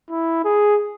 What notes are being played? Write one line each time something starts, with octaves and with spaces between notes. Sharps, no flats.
E4
G#4